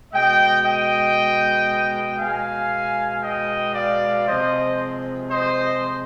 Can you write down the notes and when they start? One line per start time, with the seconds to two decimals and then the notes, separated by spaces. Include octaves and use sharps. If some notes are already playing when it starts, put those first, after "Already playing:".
0.13 B2 G#3 D#5 G5
0.64 D#5 G5
2.19 B2 G#3 F5 G#5
3.22 D#5 G5
3.74 D5 F5
4.27 C3 F3 G#3 C5 D#5
5.29 C5 D#5